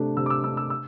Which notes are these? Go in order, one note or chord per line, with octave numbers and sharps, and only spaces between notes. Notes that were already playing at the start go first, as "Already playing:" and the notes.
Already playing: C3 A3 D4
C3 E6
D6
E6
A3 D4 E6
E6
E6